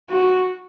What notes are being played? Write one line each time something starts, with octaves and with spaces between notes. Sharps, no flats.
F#4